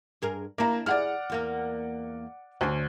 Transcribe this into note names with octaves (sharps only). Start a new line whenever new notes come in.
G2 G#4 A#4
A#3 D4 E4 A#5
E4 G#4 D5 F#5 F6
E2 A#3 A#4
D2 C#4 D4